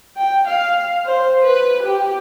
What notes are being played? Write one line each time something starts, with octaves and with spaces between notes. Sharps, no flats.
G5
F5
C5
B4
G4